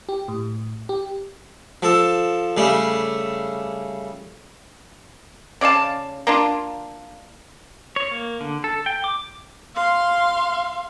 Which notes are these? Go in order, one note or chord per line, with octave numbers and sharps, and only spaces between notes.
G4
A2
G4
F3 A4
C#3 G3 A3
C#3 D5 F5 A5
A#3 D4 F4
C#5
A#3
D3
A4
G5
D6
F5 C6